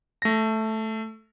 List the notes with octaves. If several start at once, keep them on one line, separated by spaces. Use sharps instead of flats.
A3 A#6